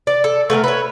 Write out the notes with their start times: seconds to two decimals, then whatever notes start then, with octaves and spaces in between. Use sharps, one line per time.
0.07 D5
0.24 A4
0.50 A3 B3 A4 A#4
0.64 B4 C#5